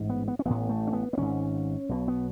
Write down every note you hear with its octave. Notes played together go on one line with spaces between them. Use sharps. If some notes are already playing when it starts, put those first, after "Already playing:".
Already playing: A1 G#2
B3
B3
C#4
A1 A2 B3
A3
C#4
B3
B3
G#1 G#2 C#4
B1 B2
B3